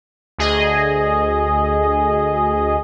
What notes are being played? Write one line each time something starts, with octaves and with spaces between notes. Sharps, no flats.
D2 G#4 D#5